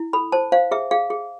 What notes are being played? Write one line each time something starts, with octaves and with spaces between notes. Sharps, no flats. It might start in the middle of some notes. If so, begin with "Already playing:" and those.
Already playing: E4
A4 B5
C5 A5
C5 F5
G#4 E5
G#4 F5
G#4